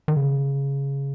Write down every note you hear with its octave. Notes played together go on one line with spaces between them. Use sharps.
D#3
C#3